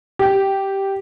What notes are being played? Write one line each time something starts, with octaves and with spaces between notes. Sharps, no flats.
G4